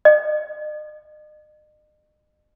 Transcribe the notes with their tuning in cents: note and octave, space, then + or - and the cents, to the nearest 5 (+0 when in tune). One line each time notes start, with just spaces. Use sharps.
D#5 -40